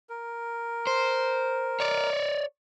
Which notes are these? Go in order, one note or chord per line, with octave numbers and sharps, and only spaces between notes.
A#4
C5
C#5 D5